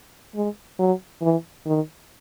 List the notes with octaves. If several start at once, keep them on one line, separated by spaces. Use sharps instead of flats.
G#3
F#3
E3
D#3